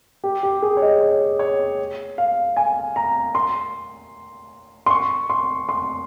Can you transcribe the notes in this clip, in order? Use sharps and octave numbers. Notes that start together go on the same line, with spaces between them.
G4
G4
G#4
C#5
D#5
C#5
C#5
F5
G#5
A#5
C6
C6
C#6
C6
C6